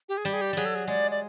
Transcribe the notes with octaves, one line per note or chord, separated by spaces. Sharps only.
G4
G#4
G3 G4
G#4
G4
F#3 G3 G#4
A4
G#4
G#3 D5
D5